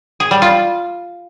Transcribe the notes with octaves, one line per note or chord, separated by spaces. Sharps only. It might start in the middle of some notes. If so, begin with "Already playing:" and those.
G#4
G3
F4